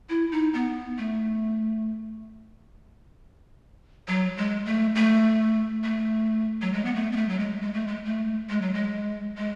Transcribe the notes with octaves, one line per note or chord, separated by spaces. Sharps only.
E4
D#4
B3
A3
F#3
G#3
A3
A3
A3
F#3
G#3
B3
A3
B3
A3
F#3
G#3
G#3
A3
G#3
A3
G#3
F#3
G#3
G#3